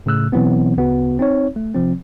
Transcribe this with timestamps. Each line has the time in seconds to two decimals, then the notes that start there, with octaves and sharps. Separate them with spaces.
0.06 A2 C#3 A3 E6 F#6
0.32 B2 E3 F#3 B3 C4
0.76 D2 C#3 B3 F#4
1.19 C4 D#4 C#5
1.56 A3
1.74 C3 F3 C4